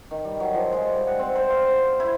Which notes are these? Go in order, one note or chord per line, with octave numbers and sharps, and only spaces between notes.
D#3
G3
F#3
F3
G#3
G3
F#5
C4
C5
F5
E4
E4